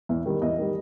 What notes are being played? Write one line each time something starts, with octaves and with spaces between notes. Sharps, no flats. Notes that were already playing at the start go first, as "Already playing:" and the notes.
E2
D#3 G3
E2 D#5
D#3 G3